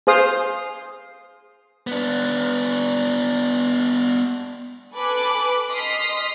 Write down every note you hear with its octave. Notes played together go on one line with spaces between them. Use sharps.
G#4 C5 F5 D#6
B3 D4
A4 B4 G#5 B5 D6 F#6
D#5 C6 D#6 F6 B6 C7